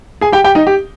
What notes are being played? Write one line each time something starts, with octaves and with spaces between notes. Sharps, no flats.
G#4 G#5
G4 G5
G4 G5
D#4 D#5
G4